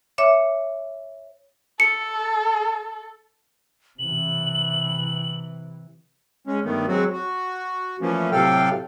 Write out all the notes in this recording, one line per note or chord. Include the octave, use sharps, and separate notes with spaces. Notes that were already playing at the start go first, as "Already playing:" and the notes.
C#5 E5 D6
A4 C#7
C3 E3 F#7
G#3 C#4
G2 D#3 A3 B3
F#3 G#3 C4 F#4
F#4
E3 F3 A3 A#3 C#4
A2 C3 F#3 A4 F5 G5